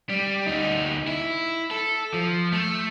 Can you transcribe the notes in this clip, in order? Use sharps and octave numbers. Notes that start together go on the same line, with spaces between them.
G3
D2 D#4
E4
A4
F3
A3